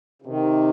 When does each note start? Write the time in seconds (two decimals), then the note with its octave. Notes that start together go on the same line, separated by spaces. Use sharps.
0.22 C#3
0.26 C3 D#3